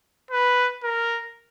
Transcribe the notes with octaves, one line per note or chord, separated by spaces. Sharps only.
B4
A#4